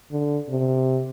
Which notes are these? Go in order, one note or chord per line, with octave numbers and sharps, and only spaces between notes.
D3
C3